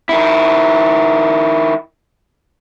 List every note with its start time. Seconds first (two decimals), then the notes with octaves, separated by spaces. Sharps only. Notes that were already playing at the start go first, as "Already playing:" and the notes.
0.09 D#3 E4